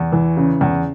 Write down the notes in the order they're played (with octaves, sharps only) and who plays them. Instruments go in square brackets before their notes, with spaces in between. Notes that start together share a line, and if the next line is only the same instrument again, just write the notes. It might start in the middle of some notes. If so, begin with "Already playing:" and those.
Already playing: [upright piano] E2
E3
C#3
E2